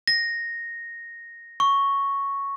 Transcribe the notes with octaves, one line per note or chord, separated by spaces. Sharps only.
A#6
C#6